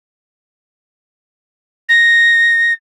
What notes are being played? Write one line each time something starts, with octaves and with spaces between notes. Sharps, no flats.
A#6